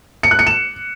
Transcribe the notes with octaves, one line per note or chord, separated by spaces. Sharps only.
C#7
F#6
C#7
E7